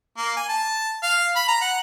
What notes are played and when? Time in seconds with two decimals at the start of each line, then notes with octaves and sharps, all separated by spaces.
0.17 A#3
0.36 G#5
0.49 A5
1.03 F5
1.36 B5
1.48 A#5
1.62 F#5